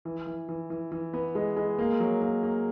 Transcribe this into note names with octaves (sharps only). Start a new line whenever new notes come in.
E3
E3
E3
E3
E3
B3
G#3
G#3
A#3
F#3
A#3
A#3